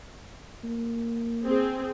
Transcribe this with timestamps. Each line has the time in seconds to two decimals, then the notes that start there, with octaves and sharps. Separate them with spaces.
0.64 A#3
1.43 C4 G#4